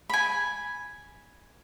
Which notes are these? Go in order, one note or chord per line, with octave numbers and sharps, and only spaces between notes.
G#5 B5